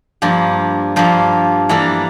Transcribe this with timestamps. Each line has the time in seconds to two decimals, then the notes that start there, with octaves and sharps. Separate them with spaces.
0.22 G2 F3 A#3
0.96 G2 F3 A#3
1.69 E3 A#3 D4 A4